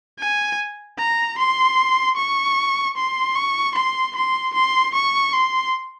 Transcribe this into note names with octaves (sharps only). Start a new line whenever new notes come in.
G#5
A#5
C6
C#6
C6
C#6
C6
C6
C6
C#6
C6